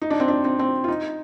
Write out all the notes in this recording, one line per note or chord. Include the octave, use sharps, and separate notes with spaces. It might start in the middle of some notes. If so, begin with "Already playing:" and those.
D#4
D4
C4
D4
C4
C4
F4
D#4